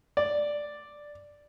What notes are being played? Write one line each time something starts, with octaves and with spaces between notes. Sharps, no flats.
D5